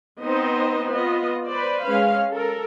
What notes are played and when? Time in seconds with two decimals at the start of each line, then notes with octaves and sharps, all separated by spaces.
0.21 B3 C4 D#4 C5 D#5
0.90 B3 F4 D#5
1.51 B4 C5 D5
1.87 G#3 C#4 F5
2.33 A4 A#4